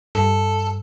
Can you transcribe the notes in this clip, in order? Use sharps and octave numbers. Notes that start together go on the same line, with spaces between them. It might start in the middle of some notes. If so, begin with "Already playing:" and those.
G2 A4